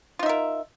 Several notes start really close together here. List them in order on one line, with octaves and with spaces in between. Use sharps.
F4 D#4 E5 A#4